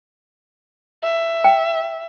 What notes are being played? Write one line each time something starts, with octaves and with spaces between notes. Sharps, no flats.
E5
G5